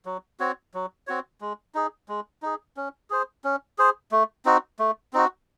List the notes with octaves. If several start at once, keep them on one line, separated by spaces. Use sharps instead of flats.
F#3
C4 F#4 C#5
F#3
C4 F#4 C#5
G#3
D#4 G#4
G#3
D#4 G#4
C#4
G#4 C5
C#4
G#4 C5
A3
C4 D#4 F#4
A3
C4 D#4 F#4